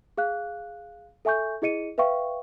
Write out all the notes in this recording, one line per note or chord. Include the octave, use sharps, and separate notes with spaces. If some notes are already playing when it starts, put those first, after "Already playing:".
G#4 F5 F#6
A4 E5 G#5 C#6 G6
E4 G#4 D#5 C#7 D#7
B4 E5 F5 G5 C#6